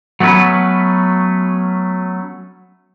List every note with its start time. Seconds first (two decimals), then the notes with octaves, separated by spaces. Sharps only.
0.20 F#3 A3 B3 C#4 B4